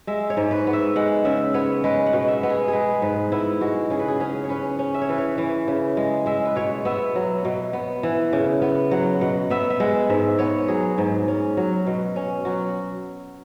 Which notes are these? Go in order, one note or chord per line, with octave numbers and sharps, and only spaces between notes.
G#3 E5
C#5
G#2
B4
B3
E5
G#3 F#5
C#3 E5
B3 C#5
G#3 B4
F#5
B2
E5
B3
G#4
G#4
G#3 B4
G#2 B4
B3 E4
G#3 F#4
C#3 G#4
B4
G#4
C#4 G#4
C#5
C#4 B4
C#4
E5
C#5
E3 B4
C#5
E3
C#3
G#3
G#3 E5
B4
B2 C#5
B3 E5
F#3
B2
B3
E3
C#3
B3
F#3 F#5
B2 F#5
B3 E5
E5
G#3 F#5
G#2 E5
B3 C#5
F#3 G#4
G#2
C#4
F#3
B2
C#4
F#3 F#4